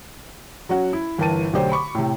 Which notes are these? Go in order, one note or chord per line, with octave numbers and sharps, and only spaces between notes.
F#3 C#4 F#4
E4
G1 E3 A#4 G5 A5 D#7
B1 D3 A3 G4 C5 C#5
B5 C#6 D6
A2 C3